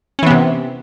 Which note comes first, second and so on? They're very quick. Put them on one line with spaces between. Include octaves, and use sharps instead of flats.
C#4 E3 B3 C3